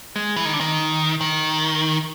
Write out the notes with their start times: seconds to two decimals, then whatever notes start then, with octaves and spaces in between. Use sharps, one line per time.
0.16 G#3
0.36 E3
0.45 D#3
0.53 D3
0.61 D#3
1.21 D#3